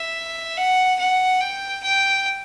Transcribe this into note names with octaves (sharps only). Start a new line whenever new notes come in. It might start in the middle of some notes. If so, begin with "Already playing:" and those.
Already playing: E5
F#5
F#5
G5
G5